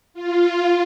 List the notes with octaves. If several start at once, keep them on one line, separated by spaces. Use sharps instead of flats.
F4